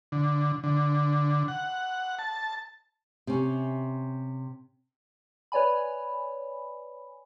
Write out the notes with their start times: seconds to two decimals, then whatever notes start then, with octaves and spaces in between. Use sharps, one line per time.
0.12 D3
0.63 D3
1.48 F#5
2.19 A5
3.27 C3 C#4
5.52 B4 C#5 D5 G#5 B5